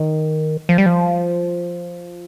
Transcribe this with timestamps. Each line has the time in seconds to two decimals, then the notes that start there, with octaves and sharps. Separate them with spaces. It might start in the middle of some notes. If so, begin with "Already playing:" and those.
Already playing: D#3
0.69 F3
0.78 G3
0.86 F3